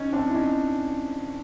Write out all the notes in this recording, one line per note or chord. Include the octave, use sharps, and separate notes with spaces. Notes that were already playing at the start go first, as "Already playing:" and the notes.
Already playing: C#4 D#4
C4 D4
E4
C#4 D#4